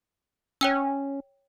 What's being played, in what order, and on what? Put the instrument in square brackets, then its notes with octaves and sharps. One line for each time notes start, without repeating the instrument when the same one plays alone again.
[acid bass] C#4 [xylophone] C#5 G5 E6